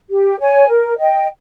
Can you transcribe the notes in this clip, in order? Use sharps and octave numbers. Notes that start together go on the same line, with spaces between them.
G4
C#5 G#5
A#4
D#5 G5